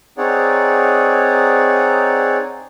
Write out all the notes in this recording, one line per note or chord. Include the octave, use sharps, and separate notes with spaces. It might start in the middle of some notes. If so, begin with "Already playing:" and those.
C4 D#4 G#4 C#5 D5 F#5